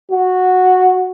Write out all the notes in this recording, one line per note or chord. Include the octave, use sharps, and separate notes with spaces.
F#4